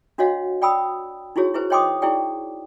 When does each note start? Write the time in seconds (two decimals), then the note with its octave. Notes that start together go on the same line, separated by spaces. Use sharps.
0.18 D4 F#4 C#5 D#5 F5 F#5
0.62 D5 G5 B5 D#6 E6
1.36 D#4 E4 F#4 G#4 C#5
1.54 E4 G#4 B4 C5
1.70 C#5 D#5 G5 C6 D6 D#6
2.02 D#4 E4 G#4 D5 G5